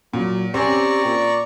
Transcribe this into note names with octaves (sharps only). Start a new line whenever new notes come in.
A#2 F#3
C4 C#4 G4 D5 A#5 C#6
A#2